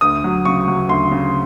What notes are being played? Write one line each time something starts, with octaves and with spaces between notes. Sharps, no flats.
D2 D#6
F#3
C#3 C#6
F#3
D2 C6
C#3